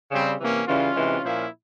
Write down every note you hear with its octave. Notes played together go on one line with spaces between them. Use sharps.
C#3 G3 C4
C3 E3 A#3 C#4
C#3 E3 G3 C#4 F4
C3 E3 G#3
A#2 F3 A#3 C#4 E4